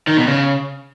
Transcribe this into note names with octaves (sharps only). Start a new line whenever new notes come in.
D#3
B2
C#3